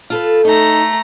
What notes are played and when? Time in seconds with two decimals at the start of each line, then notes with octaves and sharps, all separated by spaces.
0.10 F4 A4 B4
0.45 A3 D#4 A#5